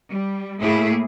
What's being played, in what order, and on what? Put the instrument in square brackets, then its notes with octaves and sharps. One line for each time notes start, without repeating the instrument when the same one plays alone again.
[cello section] G3
A2 A3 A#3 E4 G#4